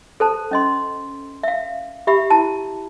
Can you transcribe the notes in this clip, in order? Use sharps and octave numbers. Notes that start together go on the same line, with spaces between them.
A4 C5 A5
C#4 D#5 C6
E5 F5
G4 E5 B5
E4 A5